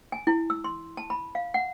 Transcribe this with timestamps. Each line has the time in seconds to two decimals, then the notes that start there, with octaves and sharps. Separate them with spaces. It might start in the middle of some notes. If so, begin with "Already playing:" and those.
0.12 G#5
0.27 E4
0.50 E6
0.64 C6
0.97 A5
1.10 B5
1.35 F5
1.54 F#5